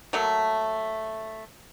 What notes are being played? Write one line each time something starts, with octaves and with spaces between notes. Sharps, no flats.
F#3 A3 A#3